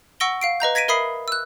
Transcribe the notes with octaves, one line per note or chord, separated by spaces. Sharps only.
F#5 C#6 E6 A#6 D7 G7
F5 C7 D7
B4 D#5 A#5 G6
G#6 A#6 B6 D7 D#7
A#4 E5 B5 D#6 C7
E6 F#6